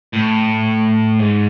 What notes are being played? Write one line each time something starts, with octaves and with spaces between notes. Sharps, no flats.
A2
G#2